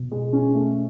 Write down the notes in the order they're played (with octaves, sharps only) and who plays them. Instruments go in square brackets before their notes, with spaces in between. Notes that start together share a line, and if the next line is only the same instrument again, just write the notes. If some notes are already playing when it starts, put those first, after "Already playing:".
Already playing: [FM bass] B2
[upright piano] G#3
C#4
A3